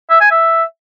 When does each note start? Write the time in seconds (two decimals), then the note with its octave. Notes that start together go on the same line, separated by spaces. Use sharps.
0.10 E5
0.21 G#5
0.31 E5